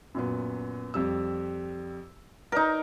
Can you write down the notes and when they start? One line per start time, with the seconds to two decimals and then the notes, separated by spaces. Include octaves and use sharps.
0.15 F#2 A#2 B3
0.94 F2 G3 E6
2.52 D#4 A#4 B4 D5 A#5